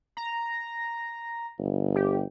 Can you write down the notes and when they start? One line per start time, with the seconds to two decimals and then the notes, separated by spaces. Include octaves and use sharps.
0.17 A#5
1.59 G1
1.95 G4